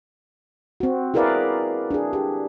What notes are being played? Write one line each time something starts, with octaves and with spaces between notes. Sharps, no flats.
C4 F#4
E4 G#4 A#4 B4 D5 F5
D4 G#4
G4